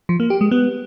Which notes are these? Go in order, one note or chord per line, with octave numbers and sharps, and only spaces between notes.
F3
A#3
G4
G#3
B3